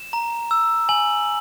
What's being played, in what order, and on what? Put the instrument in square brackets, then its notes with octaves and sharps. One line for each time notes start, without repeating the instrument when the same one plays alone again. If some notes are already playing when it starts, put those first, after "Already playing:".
Already playing: [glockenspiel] E7
A#5
E6
G#5 F#7